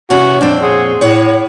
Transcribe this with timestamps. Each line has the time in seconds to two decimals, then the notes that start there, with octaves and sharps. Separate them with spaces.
0.10 C3 E3 C#4 F#4
0.41 F2 A#2 C4 D4
0.62 G#4 C#5 F#5 C6
1.01 A2 C#5 F#5